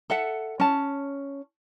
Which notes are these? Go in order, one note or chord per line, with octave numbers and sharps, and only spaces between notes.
A4 E5 F#5
C#4 A5